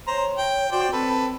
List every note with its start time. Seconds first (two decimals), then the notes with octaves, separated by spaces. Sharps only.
0.07 C5 C#5 A#5
0.38 G5
0.72 F#4 C5 D5 G5
0.93 C4 A4 B4